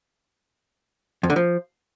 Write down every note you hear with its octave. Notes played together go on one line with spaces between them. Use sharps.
F2
D3
F3